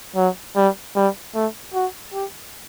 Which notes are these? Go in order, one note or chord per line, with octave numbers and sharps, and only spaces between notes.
F#3
G3
G3
A3
F#4
G4